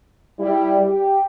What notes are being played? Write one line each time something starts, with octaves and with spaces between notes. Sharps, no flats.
G3 E4
G4